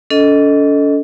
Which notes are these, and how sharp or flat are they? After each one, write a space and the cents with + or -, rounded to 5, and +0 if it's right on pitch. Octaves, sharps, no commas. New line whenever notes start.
C#4 +45 A4 +0 D#5 +0